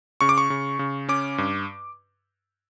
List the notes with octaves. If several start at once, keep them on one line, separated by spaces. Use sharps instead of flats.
C#3 C#6
D6
C#6
C#3
C#3
C#4 D6
G2